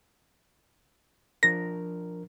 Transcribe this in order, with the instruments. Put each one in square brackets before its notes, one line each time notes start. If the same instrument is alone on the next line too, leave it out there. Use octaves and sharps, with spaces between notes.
[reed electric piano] F3 D4 A#4 [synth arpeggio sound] A#6